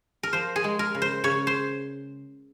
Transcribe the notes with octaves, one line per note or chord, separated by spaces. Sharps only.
A#4
F3 C5
G#4
G#3
A#4
C#3
C5
C#3 C#5
C5